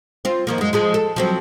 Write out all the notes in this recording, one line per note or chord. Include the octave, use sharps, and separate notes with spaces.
C4 F4
D#3 F3 A#3
F#2 G#3
F3 G#3 G#4
A4
F3 F#3 C4